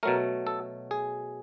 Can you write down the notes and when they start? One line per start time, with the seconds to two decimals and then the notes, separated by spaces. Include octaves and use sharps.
0.03 B2 F#3 A3 A#4
0.47 A4
0.91 G#4